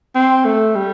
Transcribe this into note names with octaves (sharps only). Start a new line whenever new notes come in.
C4
A3
G3